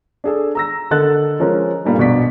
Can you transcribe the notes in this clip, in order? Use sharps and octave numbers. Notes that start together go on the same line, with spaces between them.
D4 G#4 A4
A#5 E6 A#6
D3 A4 A#4 D#5 F#6 A6
F3 G#3 C#4 A#4
G2 A#2 G3 A3 A#3 D#4
A#1 B2 D5 B6